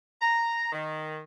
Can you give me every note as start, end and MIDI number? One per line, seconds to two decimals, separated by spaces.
0.22 0.68 82
0.72 1.21 51